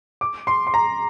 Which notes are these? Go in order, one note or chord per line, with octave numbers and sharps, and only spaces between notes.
D6
C6
C6
A#5